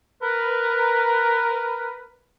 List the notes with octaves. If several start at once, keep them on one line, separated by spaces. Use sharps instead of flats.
A#4 B4